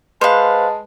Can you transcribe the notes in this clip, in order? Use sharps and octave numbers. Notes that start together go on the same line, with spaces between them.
G#3 B4 C5 F5 A5 B5